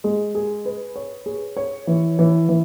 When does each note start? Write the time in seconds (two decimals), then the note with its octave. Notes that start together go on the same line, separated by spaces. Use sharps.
0.04 G#3
0.35 G#4
0.65 B4
0.96 C#5
1.26 G#4
1.57 C#5
1.87 E3
2.19 E3
2.49 E3